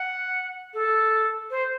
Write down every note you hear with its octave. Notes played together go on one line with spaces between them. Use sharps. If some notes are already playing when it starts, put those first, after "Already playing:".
Already playing: F#5
A4
C5